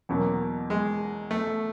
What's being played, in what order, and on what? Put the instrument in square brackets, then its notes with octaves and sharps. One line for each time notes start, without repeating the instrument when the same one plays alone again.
[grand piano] E2 B2 F#3 A#3
[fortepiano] G#3
A3